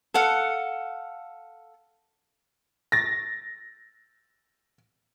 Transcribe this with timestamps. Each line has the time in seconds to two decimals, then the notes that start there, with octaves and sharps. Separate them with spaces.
0.14 A4 F5 F#5
2.92 A6 A#6